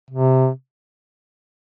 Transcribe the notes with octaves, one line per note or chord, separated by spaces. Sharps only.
C3